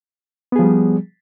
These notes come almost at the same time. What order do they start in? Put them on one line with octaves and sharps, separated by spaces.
B3 G#4 F3 G3